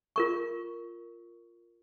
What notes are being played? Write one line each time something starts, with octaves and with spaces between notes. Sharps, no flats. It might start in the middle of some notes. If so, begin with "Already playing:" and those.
F4 A#4 C#6